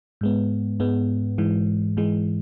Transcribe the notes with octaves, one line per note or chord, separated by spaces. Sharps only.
G#2 G#3 B3
G#2 G#3 B3
G#2 E3 G#3
G#2 E3 G#3